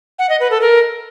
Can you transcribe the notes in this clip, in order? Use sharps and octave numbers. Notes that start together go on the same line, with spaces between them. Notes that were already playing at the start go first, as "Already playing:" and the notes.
F#5
D#5
B4
A4
A#4